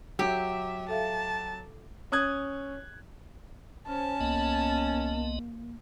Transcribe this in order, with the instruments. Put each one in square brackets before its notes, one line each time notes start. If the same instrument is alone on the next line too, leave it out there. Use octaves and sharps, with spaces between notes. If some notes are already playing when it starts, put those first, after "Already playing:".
[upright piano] F#3 [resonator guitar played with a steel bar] G4 [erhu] E5
[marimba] A4 E5 F5 [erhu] A5
[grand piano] C#4 D#6 F#6 G#6
[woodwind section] C#4 [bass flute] C5 [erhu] A5
[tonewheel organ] C2 B3 D#5 [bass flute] A#3